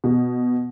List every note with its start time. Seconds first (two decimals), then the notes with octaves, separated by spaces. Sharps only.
0.04 B2